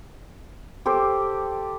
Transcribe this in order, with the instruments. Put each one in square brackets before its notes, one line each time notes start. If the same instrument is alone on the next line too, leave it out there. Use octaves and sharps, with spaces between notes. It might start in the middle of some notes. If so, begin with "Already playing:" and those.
[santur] G4 A4 C5 D6